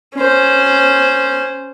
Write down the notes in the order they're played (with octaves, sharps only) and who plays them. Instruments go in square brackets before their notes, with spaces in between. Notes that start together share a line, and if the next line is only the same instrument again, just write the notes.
[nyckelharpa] C#4 C5